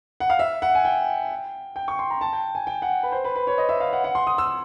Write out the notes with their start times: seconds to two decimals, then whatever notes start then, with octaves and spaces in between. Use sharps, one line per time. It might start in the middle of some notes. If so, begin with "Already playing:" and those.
0.20 F#5
0.30 F5
0.39 E5
0.62 F#5
0.75 G#5
0.85 G5
1.76 G5
1.88 C#6
1.99 C6
2.10 A#5
2.21 A5
2.33 G5
2.55 G#5
2.67 G5
2.82 F#5
3.03 B4
3.12 C5
3.24 B4
3.36 B4
3.47 C#5
3.58 D#5
3.69 E5
3.80 F5
3.93 F#5
4.04 F#5
4.15 C6
4.27 D#6
4.38 E6